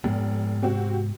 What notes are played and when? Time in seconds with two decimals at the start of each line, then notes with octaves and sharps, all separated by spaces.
0.04 F1 G#2 G#3 B3
0.62 C3 C4 F#4